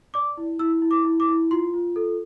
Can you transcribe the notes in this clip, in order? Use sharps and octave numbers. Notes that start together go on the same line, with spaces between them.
D5 D6
E4
E4 E6
E4
D6
E4
D6
E4
F4 C6
F4
A4